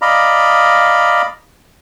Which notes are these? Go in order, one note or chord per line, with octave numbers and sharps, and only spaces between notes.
D5 D#5 F5 A#5 B5